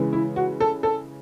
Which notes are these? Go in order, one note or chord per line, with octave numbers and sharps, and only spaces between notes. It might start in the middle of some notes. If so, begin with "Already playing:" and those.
Already playing: C#3 E3 G#3
E4
F#4
A4
A4